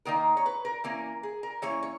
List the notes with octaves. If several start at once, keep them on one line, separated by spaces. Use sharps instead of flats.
D#3 A#3 D#4 A#4
C#5
B4
A#4
E3 A#3 C#4 A#4
G#4
A#4
E3 A#3 C#4 C#5
C#5